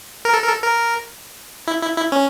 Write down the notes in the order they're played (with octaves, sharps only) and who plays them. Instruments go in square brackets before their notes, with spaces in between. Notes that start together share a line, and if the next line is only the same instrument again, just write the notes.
[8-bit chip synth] A#4
A4
A#4
A4
A#4
E4
E4
E4
C#4